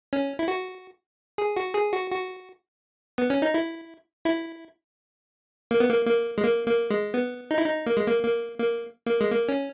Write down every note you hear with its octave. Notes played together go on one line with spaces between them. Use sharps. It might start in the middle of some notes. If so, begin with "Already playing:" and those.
C#4
E4
F#4
G#4
F#4
G#4
F#4
F#4
B3
C#4
D#4
E4
E4
A#3
B3
A#3
A#3
G#3
A#3
A#3
G#3
B3
D#4
E4
D#4
A#3
G#3
A#3
A#3
A#3
A#3
G#3
A#3
C#4